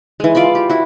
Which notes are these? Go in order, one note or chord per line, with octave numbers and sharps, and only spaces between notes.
E3 G#3
F4 D5 E5 B5
G4
E4 F#4